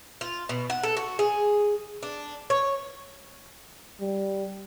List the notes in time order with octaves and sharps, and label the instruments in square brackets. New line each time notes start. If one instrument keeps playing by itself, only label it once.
[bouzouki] F4
B2
F#5
A4
F#4
G#4
D4
C#5
[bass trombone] G3